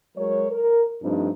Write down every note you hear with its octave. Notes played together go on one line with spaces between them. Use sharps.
F#3 G#3 A#4 C#5
A#4
G2 F3 A3 C4 D4 D#4